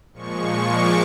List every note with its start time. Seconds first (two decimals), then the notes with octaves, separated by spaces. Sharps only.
0.13 A#2 F3 G#3 C#6
0.69 D6